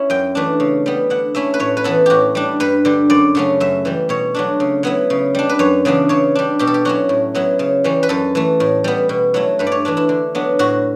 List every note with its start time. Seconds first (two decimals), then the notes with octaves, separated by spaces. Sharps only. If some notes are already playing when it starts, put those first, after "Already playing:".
Already playing: C#4 E4
0.10 F#2 G5
0.35 E3 A3 D4
0.60 C#3
0.86 G3 B3
1.10 D3 F#5
1.35 A3 C#4 E4 E5
1.54 B4
1.60 A2 C#5
1.77 B4
1.84 E3 B3 E4 A4
2.06 A2 F#4 G4
2.35 G3 D4
2.60 G2 B4
2.85 D3 G3
3.10 F#2 D5
3.35 C#3 F#3 A3 C#4
3.60 F#2 E5
3.85 E3 G3
4.09 B2 C#5
4.35 F#3 A3 D4
4.60 C#3
4.83 F#3 B3 E4
5.10 C#3
5.35 G3 D4
5.49 B4
5.59 F#2 C#5
5.85 C#3 E3 B3 D4
6.09 C#3 C#5
6.35 G3 D4
6.59 B2 G4
6.67 A4
6.74 G4
6.85 F#3 C#4 E4 F#4
7.09 A2
7.35 F#3 B3 E4
7.59 C#3
7.84 E3 G3 C#4
8.03 B4
8.09 F#2 A4
8.35 E3 A3
8.60 A2
8.84 G3 B3
9.09 B2
9.34 F#3 A3 E4
9.59 G2 B4
9.67 D5
9.72 C#5
9.85 E3 A3 D4
9.97 E4
10.09 D3
10.35 F#3 B3 D4
10.59 A2 F#4